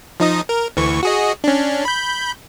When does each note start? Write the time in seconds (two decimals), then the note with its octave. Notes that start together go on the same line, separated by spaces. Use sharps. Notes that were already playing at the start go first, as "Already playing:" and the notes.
0.20 F3 D#4 D#5
0.49 A#4
0.77 D2 E3 C#6
1.03 F#4 G#4 D#5
1.44 C#4 D4
1.85 B5 G6